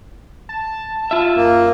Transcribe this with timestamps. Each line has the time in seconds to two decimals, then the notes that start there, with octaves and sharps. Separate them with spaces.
0.49 A5
1.11 F4 E5
1.36 F#2 A#3